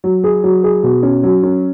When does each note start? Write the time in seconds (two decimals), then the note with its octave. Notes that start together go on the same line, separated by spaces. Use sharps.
0.04 F#3
0.24 G#4
0.44 F#3
0.64 G#4
0.83 B2
1.03 C#4
1.23 F#3
1.43 C#4